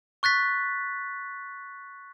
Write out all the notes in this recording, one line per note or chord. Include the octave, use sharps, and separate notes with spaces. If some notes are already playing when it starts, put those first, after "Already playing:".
C#6 F#6 A6 B6